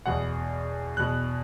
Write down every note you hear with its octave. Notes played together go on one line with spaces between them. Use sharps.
E2 B2 F#5
E2 B2 F#6